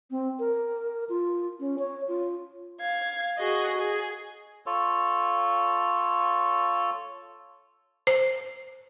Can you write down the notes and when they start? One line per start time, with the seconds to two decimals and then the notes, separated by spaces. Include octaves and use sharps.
0.11 C4
0.39 A#4
1.09 F4
1.60 C#4
1.79 C#5
2.08 F4
2.80 F5 G#6
3.38 F#4 G#4 D#5
3.79 G#4
4.66 F4 A4 C#5
8.07 C5